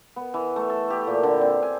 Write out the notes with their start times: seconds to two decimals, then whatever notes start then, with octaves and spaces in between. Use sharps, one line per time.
0.16 B3
0.34 E3
0.56 A3
0.70 A4
0.90 G4
1.07 A#2
1.23 D3
1.41 C4
1.63 G#5